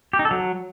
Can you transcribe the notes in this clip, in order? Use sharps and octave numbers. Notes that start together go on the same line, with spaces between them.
G4
D#4
A4
F#3